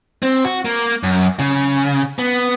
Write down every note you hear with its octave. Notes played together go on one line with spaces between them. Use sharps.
C4
F#4
A#3
F#2
C#3
B3